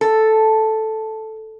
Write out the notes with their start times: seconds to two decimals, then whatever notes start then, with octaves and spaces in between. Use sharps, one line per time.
0.01 A4